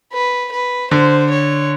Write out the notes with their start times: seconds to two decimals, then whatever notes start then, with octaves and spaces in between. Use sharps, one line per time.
0.13 B4
0.52 B4
0.91 D3 C5
1.31 C#5